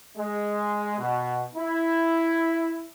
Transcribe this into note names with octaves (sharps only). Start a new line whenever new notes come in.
G#3
B2
E4